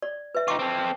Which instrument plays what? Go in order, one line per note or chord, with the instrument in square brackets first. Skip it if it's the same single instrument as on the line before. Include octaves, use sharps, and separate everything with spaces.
[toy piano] D5
B4 E5
[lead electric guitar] D#4 F4 [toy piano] G5 C#6 D6
[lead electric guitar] C4 A4